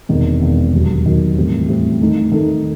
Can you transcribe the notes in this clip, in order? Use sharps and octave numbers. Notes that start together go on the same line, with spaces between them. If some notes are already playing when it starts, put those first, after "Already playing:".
E1 E2 C3 D#3
E1 E2 C3 D#3
E1 D#2 D#3 F#3
E1 D#2 D#3 F#3
A2 E3 G3 C4
A2 E3 G3 C4
D#3 A3 D#4 A4
D#3 A3 D#4 A4